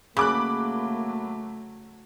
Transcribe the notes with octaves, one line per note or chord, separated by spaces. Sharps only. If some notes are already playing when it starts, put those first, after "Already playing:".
C#3 F#3 A3 A#3 B5 D6 F#6